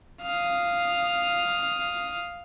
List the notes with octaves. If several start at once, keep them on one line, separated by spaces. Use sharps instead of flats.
F5 D#6